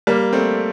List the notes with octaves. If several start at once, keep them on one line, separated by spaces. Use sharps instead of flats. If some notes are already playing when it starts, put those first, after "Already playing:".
G3 A#3
A3 C4